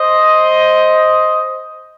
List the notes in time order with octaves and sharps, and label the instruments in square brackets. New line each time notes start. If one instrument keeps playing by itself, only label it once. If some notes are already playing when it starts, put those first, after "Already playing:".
Already playing: [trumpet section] C5 D#5